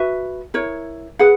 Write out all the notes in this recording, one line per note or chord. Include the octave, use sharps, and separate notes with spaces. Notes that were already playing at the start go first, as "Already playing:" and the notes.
Already playing: F#4 B4 E5
E4 A#4 C#5
G#4 B4 F#5